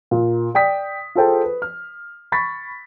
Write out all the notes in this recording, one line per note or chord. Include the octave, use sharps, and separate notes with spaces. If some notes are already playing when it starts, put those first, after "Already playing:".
A#2
D5 G5 D#6 B6
F4 G#4 A4 C5 G5 A5
B4
F6
B5 C#6 A6 B6